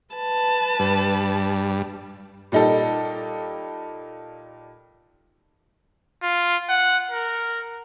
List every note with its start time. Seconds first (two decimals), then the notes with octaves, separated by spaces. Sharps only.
0.14 B4 A5
0.79 G2
2.52 A#2 G3 D#4 G4 A4
6.23 F4
6.69 F#5
7.11 A#4